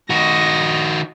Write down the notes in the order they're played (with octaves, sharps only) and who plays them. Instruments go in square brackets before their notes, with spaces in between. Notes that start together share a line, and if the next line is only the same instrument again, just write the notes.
[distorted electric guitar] D#3 F#4 [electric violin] D#5 A#6